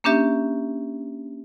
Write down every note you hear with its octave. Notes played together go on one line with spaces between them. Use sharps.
A#3 C#4 D4 G4 E5